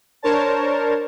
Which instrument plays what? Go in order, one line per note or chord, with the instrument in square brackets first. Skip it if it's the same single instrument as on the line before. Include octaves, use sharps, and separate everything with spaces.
[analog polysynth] D4 A#4 C5 C#5 A5